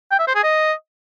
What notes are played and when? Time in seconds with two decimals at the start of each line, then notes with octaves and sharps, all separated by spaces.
0.11 G5
0.19 E5
0.27 C5
0.35 G#4
0.43 D#5